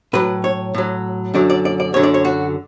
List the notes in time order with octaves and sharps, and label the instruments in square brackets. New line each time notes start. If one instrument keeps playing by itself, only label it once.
[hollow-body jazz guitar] A2 F#3 B4
C#5
A2 F#3
F#2 D3 F#3 D5
D5
D5
D5
F#2 D3 F#3 C#5
D5
C#5
F#4